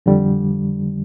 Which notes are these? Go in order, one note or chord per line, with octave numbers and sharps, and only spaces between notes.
F2 D3 G3